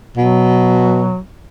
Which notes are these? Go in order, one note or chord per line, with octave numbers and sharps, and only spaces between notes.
B2 F#3